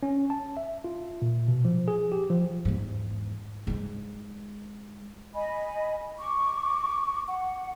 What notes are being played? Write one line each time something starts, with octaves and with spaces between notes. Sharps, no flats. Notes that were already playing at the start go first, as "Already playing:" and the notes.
C#4
A5
E5
F4
A#2
B2
F3
G#4
G4
F3
E2 G#2
G#2 G#3
D#5 G#5 B5
C#6 D6
F#5